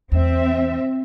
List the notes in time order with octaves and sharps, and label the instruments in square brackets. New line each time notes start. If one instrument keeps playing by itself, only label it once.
[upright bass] E2 [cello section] C4 E5